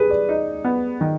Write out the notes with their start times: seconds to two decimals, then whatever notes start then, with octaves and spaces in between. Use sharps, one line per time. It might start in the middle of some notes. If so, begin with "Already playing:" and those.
Already playing: G4 G#4 B4
0.10 D5
0.29 D#4
0.64 B3
1.01 D#3